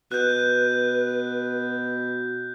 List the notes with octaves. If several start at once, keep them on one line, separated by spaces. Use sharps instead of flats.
B2 B4 F#6 G6